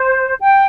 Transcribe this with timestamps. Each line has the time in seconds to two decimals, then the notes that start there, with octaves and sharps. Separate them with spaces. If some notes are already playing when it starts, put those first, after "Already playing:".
Already playing: C5
0.41 G5